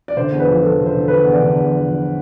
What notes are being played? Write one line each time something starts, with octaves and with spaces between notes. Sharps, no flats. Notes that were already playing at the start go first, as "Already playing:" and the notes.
D5
D3 C5
E2
B4
F3
E2 A4
F3
C5
D3
A4
D3 B4
E2
D5
D3
E2
F3
F3